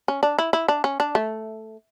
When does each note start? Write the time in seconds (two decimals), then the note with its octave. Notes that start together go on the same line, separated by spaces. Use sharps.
0.08 C#4
0.23 D4
0.39 E4
0.53 E4
0.68 D4
0.84 C#4
1.00 D4
1.15 A3